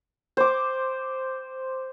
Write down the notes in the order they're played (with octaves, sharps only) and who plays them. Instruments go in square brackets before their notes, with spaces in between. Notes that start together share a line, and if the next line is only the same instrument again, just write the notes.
[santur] C5 D6